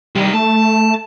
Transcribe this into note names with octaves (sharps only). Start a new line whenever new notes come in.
C2 D#3 G3
A3 A5